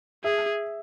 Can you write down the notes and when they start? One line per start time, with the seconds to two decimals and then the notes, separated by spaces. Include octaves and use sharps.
0.24 G#4 E5